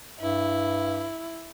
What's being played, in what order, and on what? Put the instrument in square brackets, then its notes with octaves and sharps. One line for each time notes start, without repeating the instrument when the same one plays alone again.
[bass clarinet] G2 [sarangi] E4